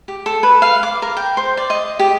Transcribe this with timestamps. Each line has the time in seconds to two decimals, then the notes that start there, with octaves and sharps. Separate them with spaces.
0.08 G4
0.26 A4
0.43 B4
0.62 F5
0.83 D6
1.02 A#4
1.17 G5
1.37 C5
1.57 D5
1.70 D#5
1.99 G4